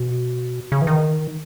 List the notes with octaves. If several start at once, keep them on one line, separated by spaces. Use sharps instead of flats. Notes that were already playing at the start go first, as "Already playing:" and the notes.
Already playing: B2
C#3
E3
D#3